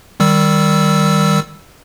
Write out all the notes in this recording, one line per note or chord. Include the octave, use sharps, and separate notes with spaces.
D#3 G3 E6